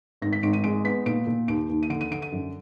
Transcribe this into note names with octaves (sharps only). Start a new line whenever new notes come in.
G#1 A#6
B6
G#1 D7
D#7
G#3 D7
B3 B6
A#2 D7
A#2
D#2 D7
D#2
D#7
D3 D7
D#7
D3 D7
D#7
F#2